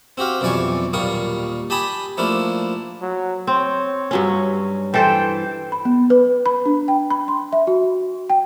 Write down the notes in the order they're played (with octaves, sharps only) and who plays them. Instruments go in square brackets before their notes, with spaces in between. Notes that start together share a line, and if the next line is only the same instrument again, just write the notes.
[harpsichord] C4 F#4 G4 F5
B1 F2 E3 D5 G#5 C#6
D#2 A#2 G3 A#3 C#6 D#6
G4 G#5 A5 B5 D#6
F3 A3 A#3 D4 E4
[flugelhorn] F#3
[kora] C4 [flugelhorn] C#5
[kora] G2 F#3 C#4
[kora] E3 A4 C5 [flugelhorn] G5
[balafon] B5
B3
B4
B5
D4
G5
B5
C6
E5
F#4
G5